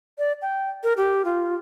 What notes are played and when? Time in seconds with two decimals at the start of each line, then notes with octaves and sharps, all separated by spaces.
0.19 D5
0.42 G5
0.84 A#4
0.97 G4
1.25 F4